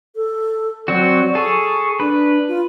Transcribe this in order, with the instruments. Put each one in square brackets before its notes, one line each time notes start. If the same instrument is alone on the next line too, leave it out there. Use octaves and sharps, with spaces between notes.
[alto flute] A4
[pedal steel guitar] F#3 C4 F#4 [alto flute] D5
[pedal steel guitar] G#4 A4 [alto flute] C#6
[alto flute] D4 [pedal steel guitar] B4
[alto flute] F4